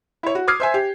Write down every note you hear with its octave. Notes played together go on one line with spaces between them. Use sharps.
E4 C#5
F#4
D6 D#6 F6 G#6 C7
C5 E5 G#5
G4